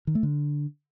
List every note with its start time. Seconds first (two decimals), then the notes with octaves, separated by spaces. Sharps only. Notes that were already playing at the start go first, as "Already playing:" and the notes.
0.07 D#3
0.15 A3
0.23 D3